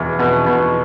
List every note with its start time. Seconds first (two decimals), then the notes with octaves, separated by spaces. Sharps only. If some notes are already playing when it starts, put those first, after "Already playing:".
Already playing: E2 B2
0.19 B2
0.46 B2